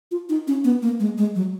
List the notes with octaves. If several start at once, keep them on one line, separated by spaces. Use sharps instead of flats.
F4
D#4
C#4
B3
A#3
G#3
G#3
F#3